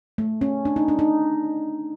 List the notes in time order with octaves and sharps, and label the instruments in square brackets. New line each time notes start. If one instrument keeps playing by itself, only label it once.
[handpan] A3
C#4
D4
D#4
D4
D#4